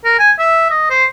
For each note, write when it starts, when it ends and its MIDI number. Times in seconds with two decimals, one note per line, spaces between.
0.05 0.15 70
0.19 0.31 80
0.39 0.69 76
0.70 0.87 75
0.90 1.04 72